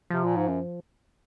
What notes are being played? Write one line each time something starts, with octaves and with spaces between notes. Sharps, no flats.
C3 F3
A#2
G#2
F#2